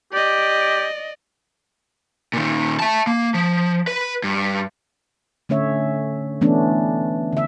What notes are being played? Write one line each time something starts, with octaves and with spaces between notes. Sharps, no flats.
G4 D5 D#5
A#2 D#3
E5 A5
A#3
F3
B4
G2
D3 A3 C#4 C#5 E5
E3 A3 B3 C#4 D4
D3 E5